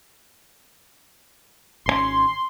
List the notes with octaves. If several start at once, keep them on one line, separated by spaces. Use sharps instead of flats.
G#1 C#3 C#4 C6